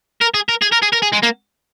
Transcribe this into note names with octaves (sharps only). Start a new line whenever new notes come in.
A#4
G#4
A#4
G#4
A#4
G#4
A#4
G#4
G#3
A#3